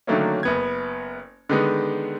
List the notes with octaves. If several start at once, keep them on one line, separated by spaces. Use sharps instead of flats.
D3 D#3 F#3 A3 A#3 C#4
F#1 B3 G#6
D3 D#3 G#3 B3 D#4